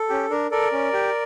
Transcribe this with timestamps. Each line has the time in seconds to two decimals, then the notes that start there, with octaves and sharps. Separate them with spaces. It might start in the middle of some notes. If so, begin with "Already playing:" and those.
Already playing: A4
0.09 C#4 G4
0.30 D4 A#4
0.51 A4 A#4 D5
0.72 C#4
0.93 G4